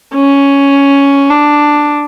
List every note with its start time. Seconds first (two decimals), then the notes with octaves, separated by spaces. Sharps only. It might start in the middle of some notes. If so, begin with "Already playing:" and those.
0.15 C#4
1.30 D4